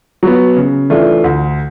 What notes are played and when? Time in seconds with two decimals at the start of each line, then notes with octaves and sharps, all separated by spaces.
0.23 F#3 B3
0.57 C#3
0.90 E3 A3 D4 F4
1.24 D2